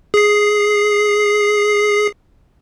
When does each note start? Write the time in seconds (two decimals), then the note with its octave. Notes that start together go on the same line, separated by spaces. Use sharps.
0.14 G#4 C7